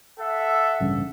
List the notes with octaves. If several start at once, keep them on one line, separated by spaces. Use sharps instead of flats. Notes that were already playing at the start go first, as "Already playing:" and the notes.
A4 E5 F#5
A1 G2 C#3